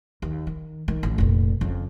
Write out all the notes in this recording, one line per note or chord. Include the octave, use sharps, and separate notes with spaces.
D#2
D#3
D#3
A1
F1 A#2
F2 C#3